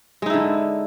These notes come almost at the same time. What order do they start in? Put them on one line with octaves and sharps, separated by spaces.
G#3 D#4 E4 D3